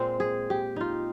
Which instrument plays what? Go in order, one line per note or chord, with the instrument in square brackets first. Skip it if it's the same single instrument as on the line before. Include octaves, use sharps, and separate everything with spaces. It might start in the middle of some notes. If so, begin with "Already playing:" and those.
Already playing: [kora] A#2 G#3 C4 C5
G#4
G4
D#4 F4